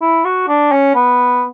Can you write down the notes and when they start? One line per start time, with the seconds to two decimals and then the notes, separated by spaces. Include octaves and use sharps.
0.01 E4
0.25 F#4
0.48 D4
0.72 C#4
0.95 B3